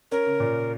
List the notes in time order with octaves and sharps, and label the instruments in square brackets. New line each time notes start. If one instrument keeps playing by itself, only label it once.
[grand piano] C#4 [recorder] A#4
[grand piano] C#3
A#2